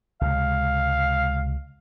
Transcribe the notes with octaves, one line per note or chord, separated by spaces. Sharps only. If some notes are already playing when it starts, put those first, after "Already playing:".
C#2 C3 G#3 F5